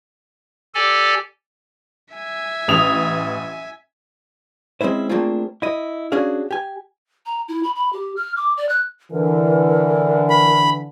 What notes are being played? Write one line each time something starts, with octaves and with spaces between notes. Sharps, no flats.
G4 A4 D5 G#5
E5 G#5
A1 D#6 F7
G#3 C4 C#4 E4 C5
A3 A#3 C4 D4 F4 G#4
E4 D#5
C#4 D4 F#4 G#4 F5
G4 G#5
A#5
E4
B5
B5
G4
F6
D6
D5
F#6
D3 E3 A#4
B5